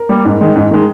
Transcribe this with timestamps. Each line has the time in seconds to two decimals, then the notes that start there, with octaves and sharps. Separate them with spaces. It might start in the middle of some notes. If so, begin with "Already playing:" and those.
Already playing: A#4
0.09 G3 A#3
0.25 G#2
0.41 D#3 G#3
0.55 G#2
0.71 D#3 G#3